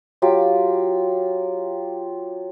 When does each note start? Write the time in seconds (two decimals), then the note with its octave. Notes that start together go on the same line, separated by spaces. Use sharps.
0.22 F#3 F4 G4